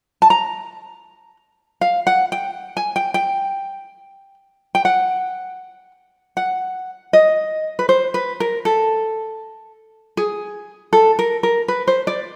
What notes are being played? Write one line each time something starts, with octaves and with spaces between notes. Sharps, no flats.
A5
A#5
F5
F#5
G5
G#5
G5
G5
G5
F#5
F#5
D#5
B4
C5
B4
A#4
A4
G#4
A4
A#4
A#4
B4
C5
D5